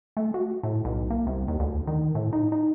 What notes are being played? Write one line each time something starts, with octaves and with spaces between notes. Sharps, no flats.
A3
F#4
A2
B1
A#3
C2
D#2
D2
D#3
A2
D#4
D#4